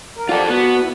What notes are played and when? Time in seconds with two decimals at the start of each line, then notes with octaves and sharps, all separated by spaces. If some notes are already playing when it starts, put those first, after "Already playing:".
0.17 A#4
0.29 F4 G4 A4 D5 F#5
0.50 B3 F#4
0.81 B3 E4